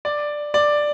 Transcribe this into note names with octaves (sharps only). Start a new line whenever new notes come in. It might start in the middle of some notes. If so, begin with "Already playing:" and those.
D5
D5